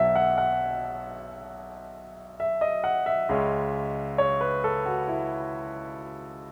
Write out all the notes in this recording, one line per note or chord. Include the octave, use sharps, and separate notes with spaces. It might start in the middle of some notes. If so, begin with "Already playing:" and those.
Already playing: B1 B2 F#3 E5
F#5
F#5
E5
D#5
F#5
E5
C#2 C#3 G#3 C#4
C#5
B4
A4
F#4
E4